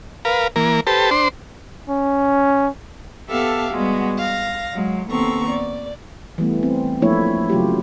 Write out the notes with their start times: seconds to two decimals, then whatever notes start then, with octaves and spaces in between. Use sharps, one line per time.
0.25 A#4 B4 F5
0.56 E3 A#3 A#4
0.87 G4 A4 B4 C5 A5
1.11 D4 C5 C6
1.89 C#4
3.31 B3 G4 A4 E5 F5 A5
3.73 G3 G#3 B3 F#4
4.18 F5 A#6
4.75 F#3 G#3
5.11 D#2 B3 C4 A4 A#5 C#6
5.50 D5
6.38 E3 G3 A3 B3
6.63 C4
7.02 F3 A3 A#3 D4 E4 C#5
7.49 C#3 F#3 A3 F4 G4